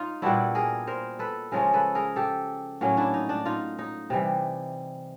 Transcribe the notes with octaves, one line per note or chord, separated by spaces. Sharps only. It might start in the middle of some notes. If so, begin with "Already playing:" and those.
Already playing: D#4 F4
A#2 G3 B3 D4 E4 F#4
G#4 A#4
A#4 C5
A4 B4
C#3 F3 G#3 C#4 G#4 A#4
A4 B4
G#4 A#4
G4 A4
A2 F#3 A#3 C#4
D4 E4
D#4
D4
D#4 F4
D#4
C3 E3 G3